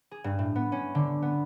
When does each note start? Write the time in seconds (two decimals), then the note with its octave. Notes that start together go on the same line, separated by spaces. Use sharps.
0.11 G#4
0.24 G2
0.39 A2
0.56 B3
0.72 C#4
0.95 D3
1.22 B3